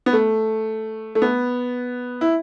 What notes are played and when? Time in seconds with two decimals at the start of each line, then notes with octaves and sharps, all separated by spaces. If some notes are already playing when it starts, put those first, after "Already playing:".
0.06 B3
0.13 A3
1.15 A3
1.22 B3
2.21 E4